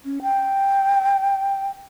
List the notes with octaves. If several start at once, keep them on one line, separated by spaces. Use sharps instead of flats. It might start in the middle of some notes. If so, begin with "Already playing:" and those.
C#4
G5